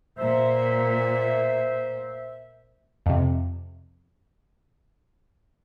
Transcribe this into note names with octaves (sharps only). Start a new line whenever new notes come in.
A#2 C5 E5
F2 C3